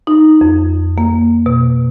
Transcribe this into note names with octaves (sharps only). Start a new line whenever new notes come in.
D#4
F2
A#3
B2